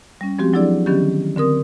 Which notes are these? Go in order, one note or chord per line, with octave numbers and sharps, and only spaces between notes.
G3 C#4
F3 G#3 C4 F#4 G4
F3 F#3 D4 E4 G#4 D5
D3 D#3 F#3 B3 C#4 G4
D3 C4 A#4 D#6